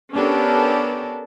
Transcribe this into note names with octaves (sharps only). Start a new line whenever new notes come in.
B3 C#4 D4 G4 A4 A#4